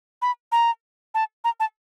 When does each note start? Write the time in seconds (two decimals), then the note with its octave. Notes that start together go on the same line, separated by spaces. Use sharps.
0.22 B5
0.52 A#5
1.14 A5
1.44 A#5
1.60 A5